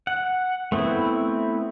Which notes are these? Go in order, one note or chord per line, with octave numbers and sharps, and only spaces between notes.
F#5
A3 B3 C4 E4